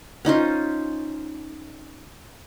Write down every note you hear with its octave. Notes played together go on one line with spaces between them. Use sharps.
C#4 D#4 F4 C5